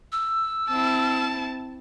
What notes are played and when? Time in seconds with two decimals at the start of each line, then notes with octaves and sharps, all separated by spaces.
0.12 E6
0.69 C4 E4 A5